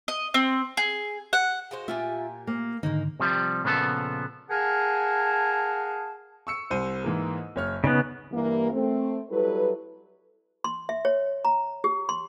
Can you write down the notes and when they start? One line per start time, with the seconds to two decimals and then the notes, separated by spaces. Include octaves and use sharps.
0.08 D#5
0.34 C4
0.77 G#4
1.33 F#5
1.71 G#3 F#4 C5 F5
1.88 A#2 F4 G4 E5 G#5
2.47 A#3
2.83 G#2 D3 D#3 G#3 A#3 D#4
3.20 C3 F3 G3
3.64 A#2 C#3 F3 B3 A4
4.50 G#4 A#4 F5 F#5 G#5 A5
6.47 C#6 E6 C#7
6.70 C2 C5 D#7
7.04 G#2 E3 A#3
7.56 F#1 C#5 F6
7.84 C#3 B3 D#4
8.32 G2 E3 A#3
8.72 A3 C4
9.31 F#3 G3 E4 A4 B4
10.64 C6
10.89 E5
11.05 C#5
11.45 A#5
11.84 G4
12.09 C6